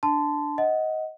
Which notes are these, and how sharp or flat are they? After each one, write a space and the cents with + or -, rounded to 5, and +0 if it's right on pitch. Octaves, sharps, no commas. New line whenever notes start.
D4 +0 A5 -5 C6 -25
D#5 +15 F#5 +0